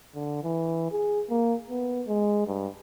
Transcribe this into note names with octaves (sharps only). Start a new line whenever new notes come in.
D3
E3
G#4
A#3
B3
G#3
G2